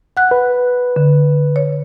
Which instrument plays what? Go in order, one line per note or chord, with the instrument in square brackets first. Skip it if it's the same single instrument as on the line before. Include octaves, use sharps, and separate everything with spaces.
[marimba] F#5 F#6
[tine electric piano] B4
[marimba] D3
C#5